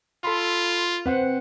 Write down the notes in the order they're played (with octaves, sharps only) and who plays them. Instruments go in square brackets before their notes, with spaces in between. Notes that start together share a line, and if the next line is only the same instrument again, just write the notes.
[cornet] F4 [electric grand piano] A4 B5 C6
[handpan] C4 F#5 [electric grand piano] B4 C5